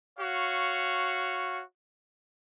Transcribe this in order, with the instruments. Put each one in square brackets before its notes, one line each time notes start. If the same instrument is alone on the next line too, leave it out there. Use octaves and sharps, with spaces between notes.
[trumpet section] F#4 C#5 F5